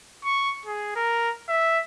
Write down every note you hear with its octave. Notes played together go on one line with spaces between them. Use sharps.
C#6
G#4
A#4
E5